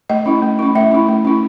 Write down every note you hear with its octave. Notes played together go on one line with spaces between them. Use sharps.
A3 D#5
C#4 E4
A3
C#4 E4
A3 E5
C#4 E4
A3
C#4 E4